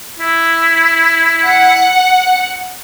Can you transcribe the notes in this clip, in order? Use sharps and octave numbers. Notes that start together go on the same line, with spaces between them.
E4
F#5